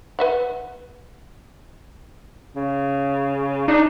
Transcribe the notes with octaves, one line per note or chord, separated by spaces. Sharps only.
B4 E5 F#5
C#3
D4 D#4